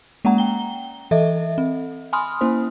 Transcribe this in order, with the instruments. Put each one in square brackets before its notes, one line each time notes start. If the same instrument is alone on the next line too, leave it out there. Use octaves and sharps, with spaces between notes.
[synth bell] G#3 A#3 C#4 F#5 A#5
G5 G7
E3 A4 D#5 E5
C4
G#5 B5 C6 D#6 F6
A#3 C#4 E4 C5